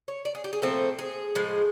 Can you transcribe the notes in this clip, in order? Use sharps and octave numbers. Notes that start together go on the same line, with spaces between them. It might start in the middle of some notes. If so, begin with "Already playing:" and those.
C#5
D5
G#4
G4
G#4
A#2 F3 A3 C4 A4
G#4
A2 F3 G#3